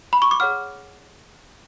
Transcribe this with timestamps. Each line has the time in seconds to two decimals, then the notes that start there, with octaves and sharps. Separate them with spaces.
0.13 B5
0.22 C#6
0.31 D6
0.40 G#4 C#5 F#5 F6